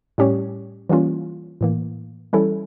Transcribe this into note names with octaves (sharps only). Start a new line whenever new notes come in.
A2 G3 C#4 G4 C#5
E3 G3 A#3 C#4 F4
A2 E3 A#3
E3 G3 C#4 E4 A4